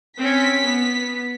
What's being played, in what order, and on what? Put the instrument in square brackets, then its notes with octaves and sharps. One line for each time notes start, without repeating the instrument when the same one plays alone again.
[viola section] C4 C#4 [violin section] B6
[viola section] B3